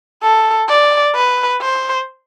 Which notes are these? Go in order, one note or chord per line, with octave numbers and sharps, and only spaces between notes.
A4
D5
B4
C5